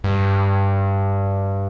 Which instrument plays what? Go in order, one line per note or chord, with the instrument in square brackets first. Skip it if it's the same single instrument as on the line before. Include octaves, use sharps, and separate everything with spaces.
[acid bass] G2